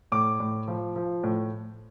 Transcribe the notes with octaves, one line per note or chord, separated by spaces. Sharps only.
A2 D6
A2
F3
F3
A2